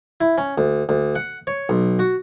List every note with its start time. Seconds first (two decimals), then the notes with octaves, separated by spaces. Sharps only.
0.21 E4
0.38 C#4
0.58 D2
0.89 D2
1.15 F#5
1.47 C#5
1.69 B1
1.99 F#4